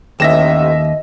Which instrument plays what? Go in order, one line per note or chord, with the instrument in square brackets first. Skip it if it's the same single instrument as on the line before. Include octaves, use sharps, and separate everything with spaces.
[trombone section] A1 [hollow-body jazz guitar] D#2 [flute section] D#5 [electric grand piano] E5 A#6 E7